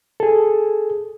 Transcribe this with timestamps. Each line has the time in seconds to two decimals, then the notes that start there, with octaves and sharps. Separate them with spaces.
0.20 G#4 A4